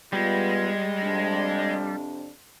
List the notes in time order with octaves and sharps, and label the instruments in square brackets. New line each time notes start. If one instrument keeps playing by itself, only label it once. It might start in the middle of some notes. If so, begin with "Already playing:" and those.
[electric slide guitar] G3 [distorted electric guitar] G#3 [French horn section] B3 F4
[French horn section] F2 C3 D4